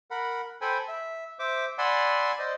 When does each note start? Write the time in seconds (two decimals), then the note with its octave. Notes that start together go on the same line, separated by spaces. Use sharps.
0.11 A#4 F#5 B5
0.61 A4 C5 G5 G#5 B5
0.88 E5
1.39 C5 E5 D6
1.78 D5 F#5 G#5 B5 C6 E6
2.39 C5 D5 D#5